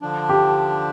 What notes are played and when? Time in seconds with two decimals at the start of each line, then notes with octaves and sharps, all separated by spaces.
0.02 D3 F3 D4
0.29 G4